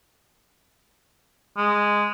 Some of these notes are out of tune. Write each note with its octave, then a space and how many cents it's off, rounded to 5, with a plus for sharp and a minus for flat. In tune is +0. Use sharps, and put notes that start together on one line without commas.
G#3 -5